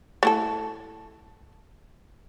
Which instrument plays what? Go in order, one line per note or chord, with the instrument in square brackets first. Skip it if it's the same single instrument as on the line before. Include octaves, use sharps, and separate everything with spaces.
[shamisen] A3 E4 A4